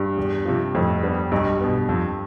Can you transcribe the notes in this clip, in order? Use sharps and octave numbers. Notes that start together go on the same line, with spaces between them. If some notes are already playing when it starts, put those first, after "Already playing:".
Already playing: G2
E2
C3 F3
F2 A2
G3 B3 D4
B1 G2
B2 B3
F2